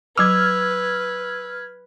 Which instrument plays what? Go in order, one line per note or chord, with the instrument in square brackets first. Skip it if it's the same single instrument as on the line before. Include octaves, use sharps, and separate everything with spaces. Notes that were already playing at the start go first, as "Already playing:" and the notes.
[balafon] F#3 D6 [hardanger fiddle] B4 [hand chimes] E6 [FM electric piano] F6 G#6